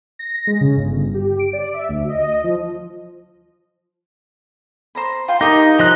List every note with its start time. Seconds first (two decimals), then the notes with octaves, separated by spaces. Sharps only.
0.19 A#6
0.47 G#3
0.61 C#3
0.77 G1
1.14 G4
1.39 D7
1.53 D5
1.74 E5
1.89 D2
2.09 D#5
2.44 F3
4.95 C5 A#5 B5
5.28 F4 G5 C6
5.41 D#4 G4 A#4 D#6
5.79 F3 D#5 F#6